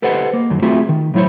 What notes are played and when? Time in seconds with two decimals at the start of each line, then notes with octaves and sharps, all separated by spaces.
0.02 G4 A4 B4 C5 D#5 F#5
0.33 A#3
0.50 F#2 D#3 F#3
0.62 A3 C4 F4 F#4 G#4 E5
0.89 D#3
1.14 A2 F#3 E4 C5 C#5